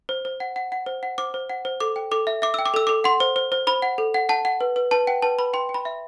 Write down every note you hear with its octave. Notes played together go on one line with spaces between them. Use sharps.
C5
C5
F#5
F#5
F#5
C5
F#5
C5 D6
C5
F#5
C5
A4 D6
G5
A4 D6
E5
E5 D6
G5 E6
D6
A4 E6
A4 D6
F#5 C6
C5
C5
C5
C5 B5
F#5
A4
F#5
F#5 A5
F#5
B4
B4
B4 A5
F#5 G5
B4 A5
B4 B5
G5 C6
G5
B5
E5